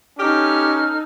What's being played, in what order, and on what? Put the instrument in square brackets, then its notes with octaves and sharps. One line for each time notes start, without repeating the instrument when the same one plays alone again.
[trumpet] C#4 [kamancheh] D#4 A4 [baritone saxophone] G4 [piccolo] F6